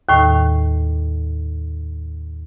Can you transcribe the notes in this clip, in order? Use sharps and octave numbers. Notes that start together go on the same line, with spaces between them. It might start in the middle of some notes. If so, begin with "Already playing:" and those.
D#2 A2 D#3